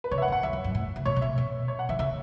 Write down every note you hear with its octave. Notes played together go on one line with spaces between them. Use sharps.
B4
C#3 C#5
E5
F#5
E3
F#5
E2 E5
F#2
F#2
A2
C#3
B2 C#5
A2
B2 E5
B2
C#5
F#5
E3 E5
C#3 E5